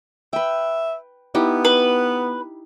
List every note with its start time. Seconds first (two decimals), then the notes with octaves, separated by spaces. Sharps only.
0.33 B4 E5 G5
1.35 B3 D#4 E4 G4
1.65 B4